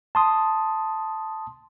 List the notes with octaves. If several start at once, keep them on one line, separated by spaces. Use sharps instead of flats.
A5 C6 D#6